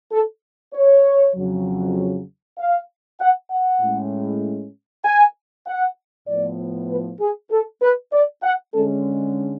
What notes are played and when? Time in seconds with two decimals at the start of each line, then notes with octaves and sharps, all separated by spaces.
0.12 A4
0.74 C#5
1.35 F2 C#3 F#3
2.58 F5
3.20 F#5
3.50 F#5
3.81 A2 G#3 C#4
5.05 G#5
5.66 F#5
6.27 A2 F3 B3 D5
6.89 B4
7.20 G#4
7.51 A4
7.82 B4
8.12 D5
8.43 F#5
8.74 D3 G#3 C#4 A4